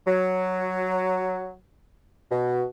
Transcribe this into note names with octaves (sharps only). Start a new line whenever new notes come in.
F#3
B2